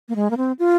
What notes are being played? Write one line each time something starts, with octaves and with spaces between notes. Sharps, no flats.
A#3
G#3
A#3
C4
F4